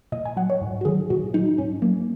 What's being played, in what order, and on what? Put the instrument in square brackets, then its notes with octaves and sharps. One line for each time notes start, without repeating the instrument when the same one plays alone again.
[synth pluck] A#2 D#5
G#5
F#3 F#5
C#5
G#2
F#4
D#3 F#3 G#4
A#2 F#4
F#3 D#4
G#2 C#4
F#3 A#3